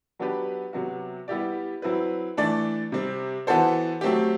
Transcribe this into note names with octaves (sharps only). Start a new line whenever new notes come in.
F#3 B3 D4 G4 B4
C3 F#3 B3 F#4
G3 B3 E4 G4 D5
F#3 C4 E4 B4
E3 A3 D4 A4 D5
C3 G3 C4
E3 B3 F#4 A4 C5
F#3 A3 C4 G4